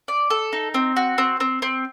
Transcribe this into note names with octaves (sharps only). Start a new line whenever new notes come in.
D5
A4
D#4
C4
F#4
C4
C4
C4